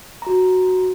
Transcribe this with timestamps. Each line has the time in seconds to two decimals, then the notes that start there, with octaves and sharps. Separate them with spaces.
0.22 F#4 A#5